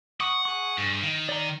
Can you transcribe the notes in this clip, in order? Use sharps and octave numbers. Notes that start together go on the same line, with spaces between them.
F#5 C#6 D#6
G#4 C#6
G2
D#3
D5 A#5